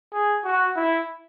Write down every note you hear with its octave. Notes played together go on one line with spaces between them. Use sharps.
G#4
F#4
E4